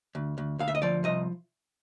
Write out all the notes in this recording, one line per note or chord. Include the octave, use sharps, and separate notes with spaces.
D2
D2
D2 F5
E5
D#5
F3 D5
C2 D#5